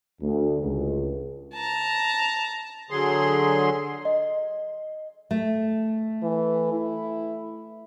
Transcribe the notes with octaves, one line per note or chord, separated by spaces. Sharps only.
D2
C#2
A5 A#5
D3 F#3 G#4 C6
D#5
A3
E3
E4